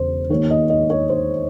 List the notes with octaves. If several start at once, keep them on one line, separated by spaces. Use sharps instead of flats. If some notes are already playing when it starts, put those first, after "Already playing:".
Already playing: E1 C#3 C5
D#2 D#3 C#5
D#5
D#5
C#5
C5